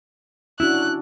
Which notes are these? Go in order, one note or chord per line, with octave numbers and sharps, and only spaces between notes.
C#4 D4 E4 F#4 F#6